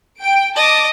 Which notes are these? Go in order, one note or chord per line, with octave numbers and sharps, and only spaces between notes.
G5 D7
D#5 A5 D6